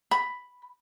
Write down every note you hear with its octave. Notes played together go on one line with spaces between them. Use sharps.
B5